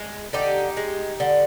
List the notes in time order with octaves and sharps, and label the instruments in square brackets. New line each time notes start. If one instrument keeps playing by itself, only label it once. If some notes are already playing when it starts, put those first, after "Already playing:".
Already playing: [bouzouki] G#3
D3 D#4 G4
G#3
D3